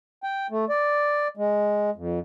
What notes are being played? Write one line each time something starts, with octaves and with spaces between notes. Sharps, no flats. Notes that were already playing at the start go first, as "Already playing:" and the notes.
G5
A3
D5
G#3
F2